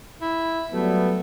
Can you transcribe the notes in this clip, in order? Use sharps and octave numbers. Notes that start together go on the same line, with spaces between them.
E4
F#3 G3 A3 B3